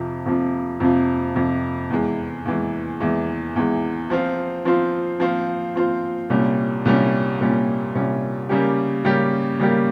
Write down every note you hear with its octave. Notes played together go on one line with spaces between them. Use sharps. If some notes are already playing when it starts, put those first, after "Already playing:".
Already playing: F2 C3 F3
F2 C3 F3
F2 C3 F3
F2 C3 F3
E2 E3 G#3
E2 E3 G#3
E2 E3 G#3
E2 E3 G#3
F3 C4 F4 C5
F3 C4 F4 C5
F3 C4 F4 C5
F3 C4 F4 C5
C2 A#2 G3 C#4
C2 A#2 G3 C#4
C2 A#2 G3 C#4
C2 A#2 G3 C#4
C#3 G3 A#3 C#4 G4
C#3 G3 A#3 C#4 G4
C#3 G3 A#3 C#4 G4